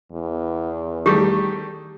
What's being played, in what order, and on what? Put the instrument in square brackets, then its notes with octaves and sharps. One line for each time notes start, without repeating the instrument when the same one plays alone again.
[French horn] E2
[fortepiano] D#3 G3 A3 [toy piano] G4 G#4